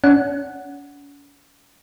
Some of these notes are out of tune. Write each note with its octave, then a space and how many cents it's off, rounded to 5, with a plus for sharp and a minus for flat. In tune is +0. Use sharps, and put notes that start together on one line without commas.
C#4 +40 F#5 +0